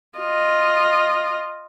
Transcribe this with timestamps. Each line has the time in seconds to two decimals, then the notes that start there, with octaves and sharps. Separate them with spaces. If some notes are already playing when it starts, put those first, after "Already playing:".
0.19 F4 D#5